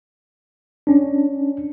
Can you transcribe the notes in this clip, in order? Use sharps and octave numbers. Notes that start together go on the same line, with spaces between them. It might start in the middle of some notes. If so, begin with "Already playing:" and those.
C#4 D4